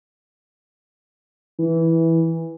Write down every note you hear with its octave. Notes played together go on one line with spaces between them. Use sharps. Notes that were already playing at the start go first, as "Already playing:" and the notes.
E3